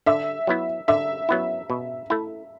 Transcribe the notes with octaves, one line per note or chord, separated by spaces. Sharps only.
D3 E5
F#3 B3 E4
D3 E5
F#3 B3 E4
B2
A3 E4